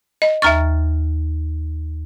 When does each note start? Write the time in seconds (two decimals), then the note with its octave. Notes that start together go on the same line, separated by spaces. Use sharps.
0.22 D#5
0.42 D#2 E5 A#5 C#6 F6 A6